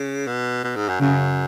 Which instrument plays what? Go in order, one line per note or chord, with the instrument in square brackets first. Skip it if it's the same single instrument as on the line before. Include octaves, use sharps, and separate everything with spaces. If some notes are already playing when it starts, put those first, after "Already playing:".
Already playing: [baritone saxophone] C#3
B2
B2
G#2
F#2
[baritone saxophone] F#2 [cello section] C#3